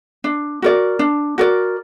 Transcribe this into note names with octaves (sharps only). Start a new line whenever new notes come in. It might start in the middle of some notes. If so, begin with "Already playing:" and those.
D4
F#4 A#4 D5
D4
F#4 A#4 D5